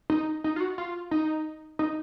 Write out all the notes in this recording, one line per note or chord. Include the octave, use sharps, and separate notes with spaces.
D#4
D#4
F4
F#4
F4
D#4
D#4